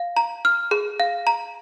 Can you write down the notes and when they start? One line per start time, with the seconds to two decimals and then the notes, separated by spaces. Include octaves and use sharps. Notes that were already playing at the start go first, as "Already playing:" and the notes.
Already playing: F5
0.16 A#5
0.45 F6
0.71 G#4
1.00 F5
1.27 A#5